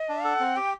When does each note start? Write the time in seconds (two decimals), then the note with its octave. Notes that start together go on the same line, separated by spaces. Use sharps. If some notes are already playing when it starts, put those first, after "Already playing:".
Already playing: D#5
0.09 D4
0.24 A4 F#5
0.40 C4
0.56 G4 G5